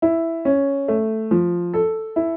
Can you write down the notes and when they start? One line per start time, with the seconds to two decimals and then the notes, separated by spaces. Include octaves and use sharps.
0.02 E4
0.45 C#4
0.88 A3
1.31 F3
1.74 A4
2.16 E4